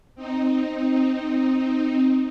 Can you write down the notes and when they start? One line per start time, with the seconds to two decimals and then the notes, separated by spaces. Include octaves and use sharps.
0.15 C4 D#4